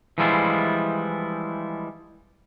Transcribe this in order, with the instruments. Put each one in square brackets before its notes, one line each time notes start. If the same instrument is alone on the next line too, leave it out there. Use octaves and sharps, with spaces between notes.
[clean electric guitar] E3 F3 G3 G#3 E4 F4